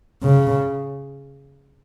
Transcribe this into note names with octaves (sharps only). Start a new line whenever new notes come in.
C#3